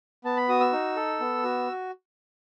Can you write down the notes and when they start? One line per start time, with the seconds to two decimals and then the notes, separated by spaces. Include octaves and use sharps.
0.25 B3 A5
0.37 B5
0.49 F#4 D#6
0.60 E6
0.73 D#4
0.96 A4
1.20 B3
1.43 F#4